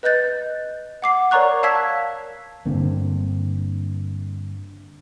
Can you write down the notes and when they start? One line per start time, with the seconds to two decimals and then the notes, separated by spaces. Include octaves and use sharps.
0.03 B4 D#5 F#6 G6 A6
1.02 F#5 D6 C7
1.31 A#4 C#5 D5 A#5 C#6 F#6
1.63 F5 A5 E6 G#6 B6
2.66 G2 D3 A#3 C4